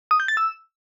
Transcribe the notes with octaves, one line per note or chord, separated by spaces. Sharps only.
D#6
G6
A6
E6